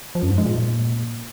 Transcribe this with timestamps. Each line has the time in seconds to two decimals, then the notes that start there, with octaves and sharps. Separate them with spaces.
0.15 F3
0.23 F#2
0.30 G#2
0.38 G#3
0.45 A#2